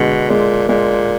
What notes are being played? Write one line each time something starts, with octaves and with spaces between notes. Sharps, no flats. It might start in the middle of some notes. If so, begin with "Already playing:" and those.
Already playing: B2 D3 G#3
A#2 G#3
A#2 G#3